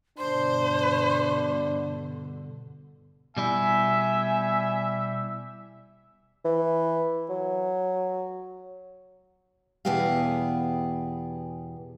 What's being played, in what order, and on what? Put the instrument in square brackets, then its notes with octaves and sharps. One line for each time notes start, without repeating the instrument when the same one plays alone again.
[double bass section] G2 B2 D3 [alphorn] D4 [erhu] C5 [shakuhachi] C6
[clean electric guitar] B2 G3 E4 [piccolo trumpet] E5 [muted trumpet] G#5
[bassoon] E3
F#3
[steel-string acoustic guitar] E2 B2 B3 G4 G#4 F5